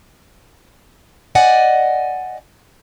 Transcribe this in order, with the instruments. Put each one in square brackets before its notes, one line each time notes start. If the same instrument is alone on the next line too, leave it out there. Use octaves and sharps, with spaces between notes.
[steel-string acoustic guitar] D5 D#5 F#5 G#5